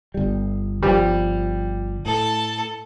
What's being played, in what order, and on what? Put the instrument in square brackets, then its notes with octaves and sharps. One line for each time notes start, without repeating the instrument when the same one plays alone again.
[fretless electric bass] G1 G3
[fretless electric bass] G1 F3 [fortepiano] G3 G4
[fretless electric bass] A2 [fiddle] A4 A5